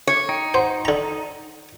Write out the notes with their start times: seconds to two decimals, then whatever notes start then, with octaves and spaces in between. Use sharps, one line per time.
0.07 C#5
0.29 D#4 G5
0.54 C5 F#5
0.85 D3 A#5